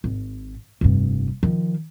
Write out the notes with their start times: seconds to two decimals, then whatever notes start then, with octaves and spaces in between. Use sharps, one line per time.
0.04 G#1
0.81 F1 G2
1.43 D#3 F3